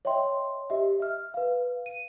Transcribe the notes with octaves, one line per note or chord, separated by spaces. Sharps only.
C#5 D#5 E5 G5 C6
G4 D#5 E5
E5 F6
B4 F5
D#7